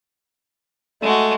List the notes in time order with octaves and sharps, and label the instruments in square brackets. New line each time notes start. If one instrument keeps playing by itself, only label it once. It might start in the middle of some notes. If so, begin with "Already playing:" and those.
[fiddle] G#3 F#4 [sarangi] A3